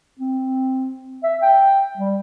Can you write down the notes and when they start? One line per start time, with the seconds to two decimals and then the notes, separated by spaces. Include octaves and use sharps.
0.19 C4
1.23 E5
1.42 G5
1.97 G3